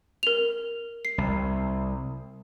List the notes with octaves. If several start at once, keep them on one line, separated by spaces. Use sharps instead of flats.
A#4 F7
C7
C2